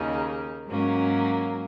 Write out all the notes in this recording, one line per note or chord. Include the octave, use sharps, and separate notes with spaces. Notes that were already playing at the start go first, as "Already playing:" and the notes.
Already playing: D#2 C#3 A#3 D#4
G#2 F#3 A#3 C#4